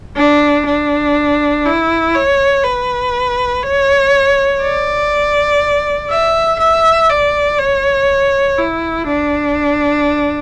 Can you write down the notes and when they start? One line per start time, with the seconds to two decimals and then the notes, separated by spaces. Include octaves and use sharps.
0.16 D4
0.66 D4
1.65 E4
2.15 C#5
2.64 B4
3.63 C#5
4.62 D5
6.10 E5
6.59 E5
7.09 D5
7.58 C#5
8.58 E4
9.06 D4